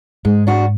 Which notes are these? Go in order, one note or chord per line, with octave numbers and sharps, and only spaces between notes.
G#2 G#3
D4 F#4